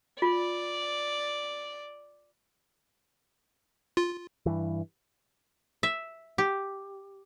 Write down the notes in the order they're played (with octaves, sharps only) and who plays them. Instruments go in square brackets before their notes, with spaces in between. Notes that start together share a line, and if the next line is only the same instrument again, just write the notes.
[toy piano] F4 [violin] D5
[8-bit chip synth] F4
[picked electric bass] G2 E3
[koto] E5
G4